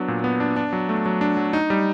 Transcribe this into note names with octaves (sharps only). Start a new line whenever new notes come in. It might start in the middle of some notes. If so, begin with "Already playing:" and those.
Already playing: F#3 B3 D4
A#2
B3
D4
D4
F#3
A3
F#3
D4
F#3
D#4
G3